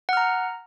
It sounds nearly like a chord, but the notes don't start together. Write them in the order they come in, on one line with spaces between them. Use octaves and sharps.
F#5 F6 A#5